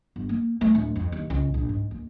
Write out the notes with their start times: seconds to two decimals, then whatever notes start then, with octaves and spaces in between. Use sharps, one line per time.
0.16 G1
0.29 A#3
0.61 A3
0.75 D1
0.96 F2
1.12 D#2
1.30 C#2
1.54 A#1
1.69 G#2
1.91 D#2